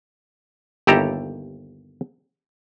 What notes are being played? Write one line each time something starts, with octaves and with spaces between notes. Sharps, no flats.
G1 D#2 E4 G4 A4 A#5